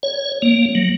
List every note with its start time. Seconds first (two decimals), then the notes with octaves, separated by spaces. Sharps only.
0.03 C#5
0.42 A#3
0.75 F#3